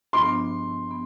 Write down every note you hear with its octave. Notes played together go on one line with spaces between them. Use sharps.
G2 F3 B3 D4 F4 C6
B3